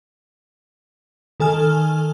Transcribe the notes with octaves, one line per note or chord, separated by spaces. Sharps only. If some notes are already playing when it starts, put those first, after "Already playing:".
D#3 A4 G#5 F6